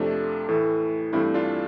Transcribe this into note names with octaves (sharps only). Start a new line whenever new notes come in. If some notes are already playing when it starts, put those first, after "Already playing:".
Already playing: F2 C3 F3 A3 D4
A2 E3 A3
G2 E3 A3 C4 E4
D4 F4